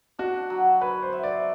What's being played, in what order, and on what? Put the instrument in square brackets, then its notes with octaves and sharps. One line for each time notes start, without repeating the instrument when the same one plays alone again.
[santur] D4 [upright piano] F#4
[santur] F#3
[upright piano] B4 [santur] C#5
[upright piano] C5
[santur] E5
[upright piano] D5